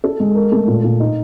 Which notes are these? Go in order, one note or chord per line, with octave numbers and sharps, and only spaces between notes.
A4
G#3
A#4
A3
A#2
A#2
D#4